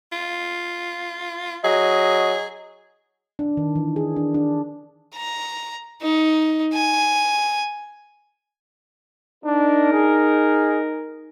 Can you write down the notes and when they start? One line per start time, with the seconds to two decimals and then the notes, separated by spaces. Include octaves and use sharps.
0.12 F4
1.64 F#3 G#4 D#5
3.39 D4
3.57 D#3
3.75 E3
3.96 G#4
4.16 D4
4.34 D4
5.15 A#5
6.02 D#4
6.74 G#5
9.44 D4 D#4 A#4
9.92 G#4